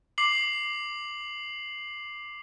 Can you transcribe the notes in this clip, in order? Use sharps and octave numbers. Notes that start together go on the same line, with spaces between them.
D6 C7 F#7